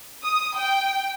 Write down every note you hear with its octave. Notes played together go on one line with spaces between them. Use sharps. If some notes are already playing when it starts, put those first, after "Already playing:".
D#6
G5